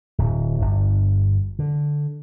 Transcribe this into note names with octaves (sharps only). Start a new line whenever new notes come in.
D1
G1
D3